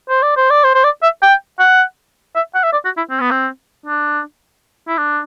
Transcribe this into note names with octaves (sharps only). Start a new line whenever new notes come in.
C5
D5
C5
D5
C5
C5
D5
E5
G5
F#5
E5
F#5
E5
D5
F#4
E4
C4
B3
C4
D4
E4
D4